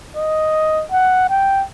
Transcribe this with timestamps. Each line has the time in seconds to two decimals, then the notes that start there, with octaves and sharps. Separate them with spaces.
0.15 D#5
0.92 F#5
1.30 G5